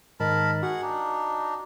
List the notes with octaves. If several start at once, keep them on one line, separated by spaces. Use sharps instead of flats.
G#2 D#3 A#4 D#5 A5 B5
F#4 G#4 F#5
D4 D#4